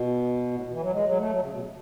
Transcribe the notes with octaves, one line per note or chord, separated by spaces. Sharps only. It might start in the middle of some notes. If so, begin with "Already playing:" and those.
Already playing: B2
A2
B2
E3
F#3
G#3
F#3
A3
F#3
C#3
B2